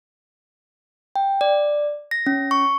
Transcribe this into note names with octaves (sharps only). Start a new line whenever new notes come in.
G5
D5
A#6
C#4
C#6